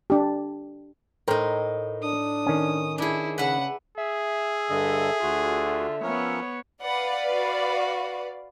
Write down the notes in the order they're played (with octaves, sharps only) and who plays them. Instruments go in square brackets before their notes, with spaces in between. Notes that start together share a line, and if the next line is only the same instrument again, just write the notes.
[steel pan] D4 G4
[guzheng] A2 D#4 [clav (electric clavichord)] A#4 C5 G5
[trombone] D4 [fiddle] D#6
[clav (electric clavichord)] D#3 C#4
[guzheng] D4 G#4 [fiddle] E4
[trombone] C#3 [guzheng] B4 E5 [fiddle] F#5
[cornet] G#4 [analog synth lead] E5
[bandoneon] G2 D3 D#5 [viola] A4
[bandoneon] D2 F#4 [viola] D3 F4
[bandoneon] F3 C#4 A#4 [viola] B3 C#5
[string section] B4 D5 F5 [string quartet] F#5
[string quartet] F#4